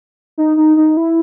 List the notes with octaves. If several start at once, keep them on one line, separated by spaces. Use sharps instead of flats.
D#4
D#4
D#4
E4